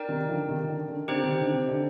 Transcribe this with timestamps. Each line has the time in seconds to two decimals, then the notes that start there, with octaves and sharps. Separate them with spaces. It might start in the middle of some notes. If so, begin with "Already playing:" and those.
Already playing: D#4 A#4 D5 G5
0.08 C3 D#3
0.29 D3 F3
0.48 C3 D#3
0.69 D3
0.88 D3
1.08 D3 C4 D#4 G4 C5 G5
1.23 C3 D#3
1.38 D3
1.54 C3
1.69 D3